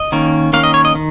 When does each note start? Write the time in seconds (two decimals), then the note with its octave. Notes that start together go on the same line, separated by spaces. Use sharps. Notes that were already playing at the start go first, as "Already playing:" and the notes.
Already playing: D#5
0.12 D#3 A#3 C#4
0.53 D#3 A#3 C#4 F5
0.63 D#5
0.74 C#5
0.85 D#5
0.95 D#3